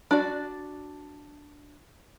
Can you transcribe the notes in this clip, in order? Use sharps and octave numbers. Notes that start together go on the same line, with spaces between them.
D4 F#4 D5